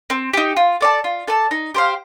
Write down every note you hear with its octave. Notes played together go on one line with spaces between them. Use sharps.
C4
D#4 G4
F4
A4 D5 A5
F4
A4 D5 A5
D#4
G4 C5 F5